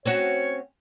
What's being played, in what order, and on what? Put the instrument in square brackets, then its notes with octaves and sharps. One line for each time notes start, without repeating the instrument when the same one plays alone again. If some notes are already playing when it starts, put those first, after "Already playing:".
[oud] C4 C#4 F#4 [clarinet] C#5